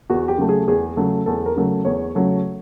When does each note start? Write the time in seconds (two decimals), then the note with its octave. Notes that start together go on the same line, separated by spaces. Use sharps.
0.10 E2 F#4
0.28 G4
0.38 C#3 F#3 A3
0.49 G#4
0.67 E2 G#4
0.97 C#3 F#3 A3
1.26 E2 A4
1.46 A#4
1.57 C#3 F#3 A3
1.85 E2 C#5
2.15 C#3 F#3 A3